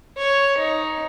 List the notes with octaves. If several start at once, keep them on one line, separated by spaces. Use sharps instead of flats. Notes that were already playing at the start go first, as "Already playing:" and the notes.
C#5
D#4